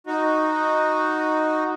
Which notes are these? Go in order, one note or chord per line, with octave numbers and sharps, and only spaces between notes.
D#4 F#4